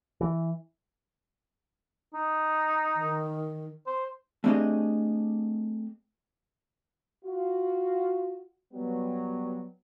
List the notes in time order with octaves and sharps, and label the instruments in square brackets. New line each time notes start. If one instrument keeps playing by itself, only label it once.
[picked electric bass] E3
[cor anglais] D#4
[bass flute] D#3
[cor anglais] C5
[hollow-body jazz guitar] A3 C4 D4 G4 G#4 D#5
[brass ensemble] F4 F#4
F#3 G3 B3